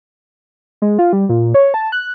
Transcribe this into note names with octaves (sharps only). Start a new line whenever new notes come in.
G#3
F4
G3
A#2
C#5
A5
F#6